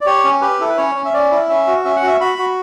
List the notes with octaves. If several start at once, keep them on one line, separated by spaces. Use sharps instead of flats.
D5
G4 C#5
C#4
G4 B4
E4 A4
B4
C#4 C#5
C#4
E5
C#4 D5
E4
C#4 E5
F#4
C#4 E5
F#5
F#4 E5
F#4 B5
F#4